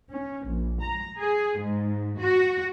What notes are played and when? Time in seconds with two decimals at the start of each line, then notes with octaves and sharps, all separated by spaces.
0.11 C#4
0.48 A#1
0.82 A#5
1.19 G#4
1.59 G#2
2.20 F#4